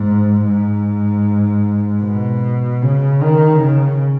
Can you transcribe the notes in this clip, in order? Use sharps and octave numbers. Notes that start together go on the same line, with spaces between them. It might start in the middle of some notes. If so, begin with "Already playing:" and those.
Already playing: G#2
G#2
B2
C#3
D#3
C#3